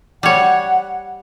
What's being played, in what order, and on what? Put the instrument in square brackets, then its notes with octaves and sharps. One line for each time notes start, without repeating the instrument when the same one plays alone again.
[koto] G3 C#5 [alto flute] F#5